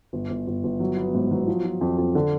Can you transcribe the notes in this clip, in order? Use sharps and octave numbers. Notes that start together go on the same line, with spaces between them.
G1
G1
G1
G1
F#3
B3
G#2
F#3
F3
F3
F2
F2
D3